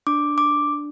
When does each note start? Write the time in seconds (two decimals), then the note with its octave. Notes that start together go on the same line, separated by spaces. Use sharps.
0.07 D4 D6
0.38 D6